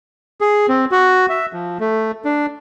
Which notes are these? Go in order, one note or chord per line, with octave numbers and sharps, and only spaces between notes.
G#4
C4
F#4
E5
F3
A3
D4